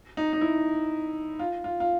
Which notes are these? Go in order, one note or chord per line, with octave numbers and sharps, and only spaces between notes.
D#4
D#4
E4
F4
F4
F4